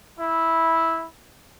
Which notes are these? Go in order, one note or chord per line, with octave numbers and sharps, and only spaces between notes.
E4